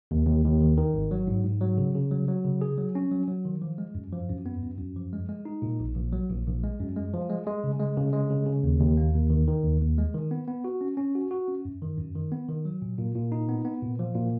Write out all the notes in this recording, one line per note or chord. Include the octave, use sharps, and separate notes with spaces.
D#2
D#2
D#2
D#3
D#3
G#1
F#3
G#2
G#2
F#3
C#3
C#3
F#3
F#3
C#3
G#4
F#3
C#4
F#3
F#3
D#3
F3
G#3
F#2
F3
F#2
B3
F#2
F#2
F3
G#3
G#3
D#4
A#2
A#1
A#1
F#3
A#1
A#1
G#3
F#2
G#3
F3
G#3
G#3
C#3
G#3
C#3
G#3
C#3
C#3
D#2
D#2
A#3
D#2
D#3
D#3
D#2
D#2
G#3
D#3
B3
B3
F#4
C#4
C#4
F#4
F#4
C#4
F#2
D#3
F#2
D#3
B3
D#3
F#3
A#2
A#2
A#2
D#4
B3
B3
A#2
F3
A#2